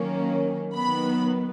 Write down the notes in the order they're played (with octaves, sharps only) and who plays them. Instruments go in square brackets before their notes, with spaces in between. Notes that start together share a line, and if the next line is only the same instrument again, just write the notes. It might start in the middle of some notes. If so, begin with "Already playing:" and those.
Already playing: [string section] D#3 F#3 A#3 C#4
D#3 F#3 B3 B5